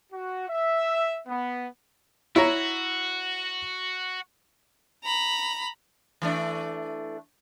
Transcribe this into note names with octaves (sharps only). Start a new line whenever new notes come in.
F#4
E5
B3
E4 F#4 C#5 A#5
A#5 B5
E3 A3 D4